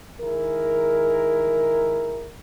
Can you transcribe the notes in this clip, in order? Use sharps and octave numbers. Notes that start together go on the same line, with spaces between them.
D#3 G#3 E4 G#4 A#4